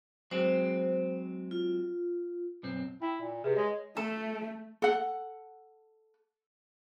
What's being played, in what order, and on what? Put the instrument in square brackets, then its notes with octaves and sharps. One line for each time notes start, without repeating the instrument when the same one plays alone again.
[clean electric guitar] F#3 G#3 C4 [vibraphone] C5
[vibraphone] F4
[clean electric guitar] B1 F#2 C4
[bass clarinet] E4 [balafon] G5
[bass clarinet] A#2
[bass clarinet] C3 [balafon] G#4 B4
[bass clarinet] G#3 [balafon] C#5
[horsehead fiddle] A3 [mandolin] A4
[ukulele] A4 F#5